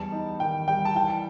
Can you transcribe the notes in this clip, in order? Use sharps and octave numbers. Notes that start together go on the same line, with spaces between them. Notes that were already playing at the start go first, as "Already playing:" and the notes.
Already playing: E2 G3 A5
D#4
D#3 G5
G3 G5
A5
E3 G5